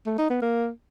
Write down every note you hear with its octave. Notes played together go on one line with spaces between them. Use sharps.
A3
D#4
B3
A#3